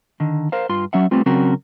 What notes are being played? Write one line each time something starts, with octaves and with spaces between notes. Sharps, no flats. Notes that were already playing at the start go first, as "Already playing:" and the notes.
D3 D#3
A#4 C5 F5
G2 F4 C6
F#3 C#4 E5 F#5
G3 A3 B3 C4 F4
C#3 F#3 C4 C#4 F#4 A#4